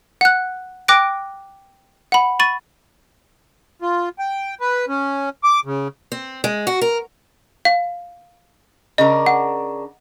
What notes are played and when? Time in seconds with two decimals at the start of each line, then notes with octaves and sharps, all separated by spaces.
0.21 F#5 F#6
0.88 G5 D6 F#6 A#6 D7
2.12 F#5 B5
2.40 B5 C#6 A6 D#7
3.82 F4
4.19 G5
4.61 B4
4.88 C#4
5.43 D6
5.65 C#3
6.12 C4
6.44 G#3
6.67 F#4
6.81 A#4
7.65 F5
8.98 C#3 D4 A#4 D#5
9.26 F#5